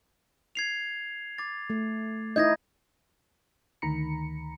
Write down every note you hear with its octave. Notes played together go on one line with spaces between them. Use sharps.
G#6 C7 F7
D6 A6
A3
D#4 E4 D#5 G6 G#6 A#6
D2 D#3 A#5 B5 C#7